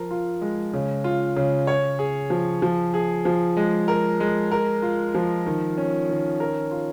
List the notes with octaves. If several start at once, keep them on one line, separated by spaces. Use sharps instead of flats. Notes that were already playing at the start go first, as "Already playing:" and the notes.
Already playing: F3 F4 A#4
F4
G#3
C#3
F4
C#3
C#5
G#4
F3
F3
G#4
F3
G#3
A#4
G#3
A#4
F4
F3
D#3
C#4
D#3
A#4
F4